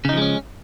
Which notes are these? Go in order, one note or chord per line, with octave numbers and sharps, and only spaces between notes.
C#3 F3 G#3 C#4 D#4